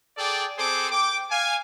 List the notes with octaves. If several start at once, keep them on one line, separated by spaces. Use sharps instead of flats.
G#4 A4 D5 G5 D6
C4 G#4 A4 C5 D6
G5 D6
F5 G#5